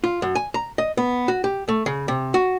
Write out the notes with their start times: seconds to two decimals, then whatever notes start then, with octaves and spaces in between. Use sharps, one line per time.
0.04 F4
0.22 F#2
0.35 G#5
0.54 A#5
0.78 D#5
0.97 B3
1.28 F#4
1.44 G4
1.68 A3
1.86 C#3
2.08 C3
2.34 F#4